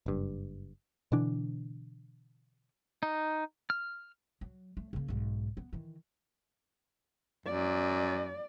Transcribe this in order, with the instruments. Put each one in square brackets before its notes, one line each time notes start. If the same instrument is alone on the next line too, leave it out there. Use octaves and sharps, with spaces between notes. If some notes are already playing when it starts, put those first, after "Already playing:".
[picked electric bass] F#1 G2
B2 D3 E3 D4
[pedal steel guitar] D#4
F6
[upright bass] F#3
A3
C#3 A#3
B1 G#2
B3
D#3 E3
[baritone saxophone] F#2 [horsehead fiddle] D5